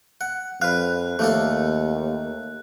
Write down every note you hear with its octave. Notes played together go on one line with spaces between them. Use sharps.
F#5
F2 B4 F5 F#6
D#2 A3 A#3 A4